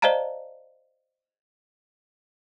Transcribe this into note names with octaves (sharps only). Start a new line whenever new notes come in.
C5 D5 D#5 F5 A5 A#5